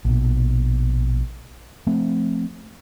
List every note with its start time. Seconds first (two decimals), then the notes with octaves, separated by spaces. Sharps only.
0.05 A#1 B2
1.87 F3 A3 C4